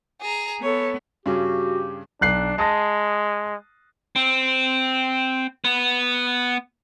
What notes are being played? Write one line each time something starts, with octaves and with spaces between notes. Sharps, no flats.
G#4 A#5
B3 A4 C#5
G2 C#3 F#4 G4
B1 D4 F#6 C7
G#3 A5 D#6 A#6
C4
B3